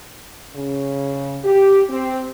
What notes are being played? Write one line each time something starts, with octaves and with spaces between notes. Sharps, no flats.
C#3
G4
C4